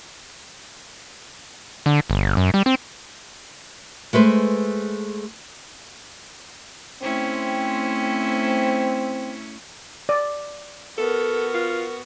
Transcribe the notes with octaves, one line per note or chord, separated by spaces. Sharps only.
D3
G1
F#2
G3
C4
G#3 A3 B4 C5
A3 C4 C#4 E4
D5
B3 F#4 A4 A#4
F4